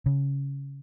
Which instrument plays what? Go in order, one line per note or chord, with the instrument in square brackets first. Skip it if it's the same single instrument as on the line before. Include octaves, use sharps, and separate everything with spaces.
[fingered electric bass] C#3